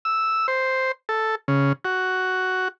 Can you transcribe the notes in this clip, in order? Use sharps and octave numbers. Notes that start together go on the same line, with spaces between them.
E6
C5
A4
C#3
F#4